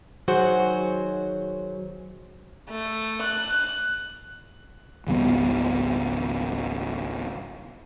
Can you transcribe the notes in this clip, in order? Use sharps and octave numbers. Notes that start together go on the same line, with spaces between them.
D#3 F#3 F#4 G#4 C5
A3
F#6
G#1 C#2 G3 B3